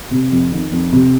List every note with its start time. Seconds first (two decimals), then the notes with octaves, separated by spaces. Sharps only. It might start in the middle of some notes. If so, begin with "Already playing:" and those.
0.11 C3
0.31 F2
0.52 D#3
0.72 F2
0.92 C3